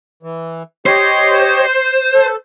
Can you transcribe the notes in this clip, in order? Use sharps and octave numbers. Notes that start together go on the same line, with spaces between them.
E3
G4 C5 C#5 D#5
A4